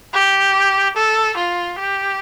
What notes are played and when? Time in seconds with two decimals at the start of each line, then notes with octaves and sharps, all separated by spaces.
0.14 G4
0.96 A4
1.37 F4
1.78 G4